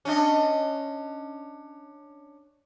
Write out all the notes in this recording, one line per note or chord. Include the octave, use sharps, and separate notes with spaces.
C#4 D4 D#5